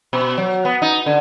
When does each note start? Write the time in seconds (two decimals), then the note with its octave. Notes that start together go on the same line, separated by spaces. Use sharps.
0.13 B2
0.38 F#3
0.65 B3
0.82 D#4
1.06 D3